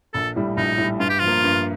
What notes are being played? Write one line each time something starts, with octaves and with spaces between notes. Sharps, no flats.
A#1 A4
A2 G3
A#1 D#4
A2
G3
G2 F4
G4
F3 F4
A#3
G2